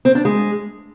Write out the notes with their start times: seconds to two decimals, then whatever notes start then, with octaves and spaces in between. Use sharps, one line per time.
0.05 C4
0.15 D4
0.25 G#3